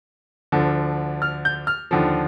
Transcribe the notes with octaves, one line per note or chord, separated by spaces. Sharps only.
D2 D3 F3
F6
G6
F6
D#2 D3 F3